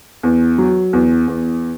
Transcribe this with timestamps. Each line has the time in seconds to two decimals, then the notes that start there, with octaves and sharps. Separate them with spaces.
0.23 E2
0.58 F#3
0.93 E2
1.28 E2